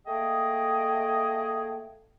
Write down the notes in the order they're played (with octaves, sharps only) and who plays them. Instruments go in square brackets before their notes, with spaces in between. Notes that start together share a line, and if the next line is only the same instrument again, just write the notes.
[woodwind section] A3 A#3 G#4 D#5 G5